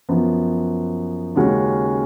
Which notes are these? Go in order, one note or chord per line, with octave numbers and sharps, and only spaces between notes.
F#2 F3 B3
D#2 C#3 G#3 C#4 F#4